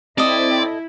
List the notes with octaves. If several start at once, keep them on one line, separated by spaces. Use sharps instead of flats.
C4 E4 A4 D5 D#5